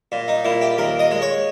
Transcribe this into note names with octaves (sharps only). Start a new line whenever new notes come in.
A#2
D#4
A#2 E4
G4
D#2 A#4
D#5
G#3
C#5